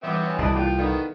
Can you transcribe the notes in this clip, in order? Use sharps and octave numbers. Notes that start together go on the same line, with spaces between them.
E3 G3 B3 C4 E5 D6
C#5 G#5
C2 B2 E4 G#4 D5 D#5 A5
A#3 E4 F4 G#4 G5
D#3 B3 A4 D5 F5